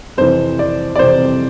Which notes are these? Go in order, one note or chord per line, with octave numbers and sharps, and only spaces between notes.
F2 C3 E3 C5
D5
D5
F2 C3 E3 C5